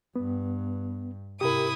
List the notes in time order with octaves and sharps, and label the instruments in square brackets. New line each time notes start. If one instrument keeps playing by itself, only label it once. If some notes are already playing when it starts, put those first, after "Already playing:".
[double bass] G2 [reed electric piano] B3
[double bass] G#2 C3 [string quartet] E4 D#6 [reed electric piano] G4 A#4